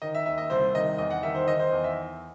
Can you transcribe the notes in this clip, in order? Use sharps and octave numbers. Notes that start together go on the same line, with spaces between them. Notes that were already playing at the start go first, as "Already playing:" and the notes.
D#3 D#5
E5
D#2 E5
D#5
C2 C5
D#3 D#5
E2 D#5
F#5
D#3 E5
C5
D#3 D#5
C5
E2
E5